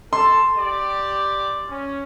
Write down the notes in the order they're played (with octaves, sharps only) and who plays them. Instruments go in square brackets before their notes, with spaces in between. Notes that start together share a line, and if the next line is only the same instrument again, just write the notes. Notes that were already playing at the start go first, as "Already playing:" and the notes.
[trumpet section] A4 [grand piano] C6
[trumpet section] G4 D5
C#4